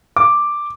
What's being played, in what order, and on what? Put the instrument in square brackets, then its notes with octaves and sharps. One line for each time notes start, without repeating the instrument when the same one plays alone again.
[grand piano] D6